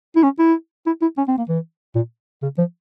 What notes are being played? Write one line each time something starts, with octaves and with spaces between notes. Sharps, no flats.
E4
C#4
E4
E4
E4
C#4
C4
A#3
E3
A#2
C#3
F3